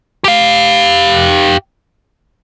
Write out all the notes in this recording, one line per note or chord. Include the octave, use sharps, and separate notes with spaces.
G4 F5